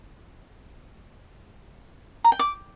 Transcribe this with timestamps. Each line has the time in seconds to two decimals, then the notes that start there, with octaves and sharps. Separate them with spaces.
2.24 A#5
2.32 G5
2.39 D6